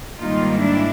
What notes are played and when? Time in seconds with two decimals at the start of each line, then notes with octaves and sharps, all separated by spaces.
0.20 G#2 D#3 G3 A#3 D#4 F4
0.61 D4 E4